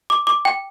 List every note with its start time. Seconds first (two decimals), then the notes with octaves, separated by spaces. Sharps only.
0.10 D6
0.27 D6
0.45 G5